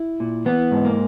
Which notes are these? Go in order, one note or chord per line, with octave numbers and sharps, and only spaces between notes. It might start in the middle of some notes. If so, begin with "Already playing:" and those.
Already playing: E4
A#2
E3 B3
G#2
A#3